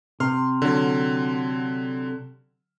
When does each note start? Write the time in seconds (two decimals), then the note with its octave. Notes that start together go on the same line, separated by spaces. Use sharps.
0.20 C3 C6 F6
0.62 D3 F#3